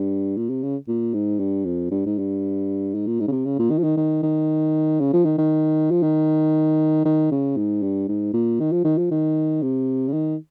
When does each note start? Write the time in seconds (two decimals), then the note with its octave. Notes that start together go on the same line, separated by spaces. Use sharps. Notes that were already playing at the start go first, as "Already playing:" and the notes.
Already playing: G2
0.37 A#2
0.50 C3
0.63 C#3
0.88 A#2
1.14 G#2
1.40 G2
1.66 F2
1.91 G2
2.06 G#2
2.19 G2
2.95 G#2
3.07 A#2
3.20 G#2
3.28 C#3
3.32 C3
3.46 C#3
3.59 A#2
3.71 D#3
3.79 F3
3.84 D#3
3.97 D#3
4.23 D#3
5.00 C#3
5.13 F3
5.25 D#3
5.38 D#3
5.91 F3
6.03 D#3
7.05 D#3
7.32 C#3
7.57 G#2
7.83 G2
8.08 G#2
8.34 A#2
8.60 D#3
8.72 F3
8.85 D#3
8.98 F3
9.11 D#3
9.62 C3
10.09 C#3
10.13 D#3